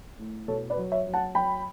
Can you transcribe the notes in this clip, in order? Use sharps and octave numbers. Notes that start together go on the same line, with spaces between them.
A2
B2 A4 C#5
B4 D5
F#3
C#5 E5
F#3
F#5 A5
F#3 G5 B5